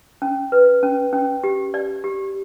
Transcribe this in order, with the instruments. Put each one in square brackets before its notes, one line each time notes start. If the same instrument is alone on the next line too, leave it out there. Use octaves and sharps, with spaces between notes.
[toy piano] C#4
B4
C#4
C#4
G4
D5
G4